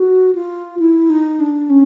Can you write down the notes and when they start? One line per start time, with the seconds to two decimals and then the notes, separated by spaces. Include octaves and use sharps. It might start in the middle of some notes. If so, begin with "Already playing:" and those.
Already playing: F#4
0.35 F4
0.79 E4
1.10 D#4
1.40 D4
1.70 C#4